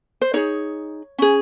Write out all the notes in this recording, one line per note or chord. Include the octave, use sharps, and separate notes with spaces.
C5
D#4 G#4 C#5
C#4 G#4